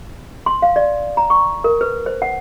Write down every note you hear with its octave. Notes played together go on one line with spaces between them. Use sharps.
C6
F5
D5
A#5
C#6
A#4
B4
C5
F#5